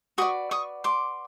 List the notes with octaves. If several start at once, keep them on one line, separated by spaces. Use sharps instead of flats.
F#4 B4 D5 C#6 D#6
C#6 D#6
C6 D6